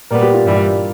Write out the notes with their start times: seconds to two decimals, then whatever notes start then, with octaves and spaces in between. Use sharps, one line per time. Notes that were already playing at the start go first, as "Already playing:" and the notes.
0.10 A#2 G3 B3 A#4
0.22 G4
0.34 F4
0.46 G2 E3 G3